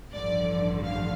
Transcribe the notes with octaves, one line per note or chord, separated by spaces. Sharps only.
A1 G2 D3 F3 D5
F5